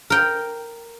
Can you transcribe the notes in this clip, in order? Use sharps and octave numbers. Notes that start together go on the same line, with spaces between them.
A#4 G5